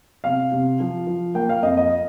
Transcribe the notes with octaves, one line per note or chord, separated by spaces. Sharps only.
C3 F5
C3
F3
F3
A#3 G5
F5
F2 D#5
D#5